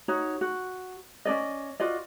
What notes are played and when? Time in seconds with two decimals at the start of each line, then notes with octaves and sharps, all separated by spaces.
0.08 D#4 F#4 C#5
0.41 F#4
1.25 C#4 D4 D5 D#5
1.80 F4 F#4 D5 D#5